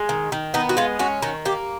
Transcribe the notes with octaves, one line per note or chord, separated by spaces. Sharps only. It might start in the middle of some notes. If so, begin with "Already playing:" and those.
Already playing: G#3
D#3
D#3
B3 D#4
F#4
G#3 F4
C#4 F#4
D#3 F#4
A#3 G4